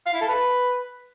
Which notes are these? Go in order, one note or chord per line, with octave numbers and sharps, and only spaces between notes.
F5
E4
A4
B4